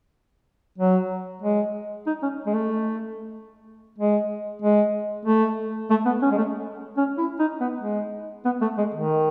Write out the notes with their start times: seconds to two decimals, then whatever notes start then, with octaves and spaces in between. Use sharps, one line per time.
0.78 F#3
1.42 G#3
2.06 D#4
2.22 C#4
2.46 G#3
2.54 A3
3.98 G#3
4.62 G#3
5.25 A3
5.90 A3
6.05 B3
6.22 C#4
6.32 G#3
6.37 A3
6.97 C#4
7.18 E4
7.39 D#4
7.60 B3
7.81 G#3
8.45 B3
8.61 A3
8.78 G#3
8.94 D#3